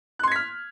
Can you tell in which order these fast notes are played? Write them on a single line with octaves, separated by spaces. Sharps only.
F#6 C6 G#6 B6 F6